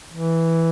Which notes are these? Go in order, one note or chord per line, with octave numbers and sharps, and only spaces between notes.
E3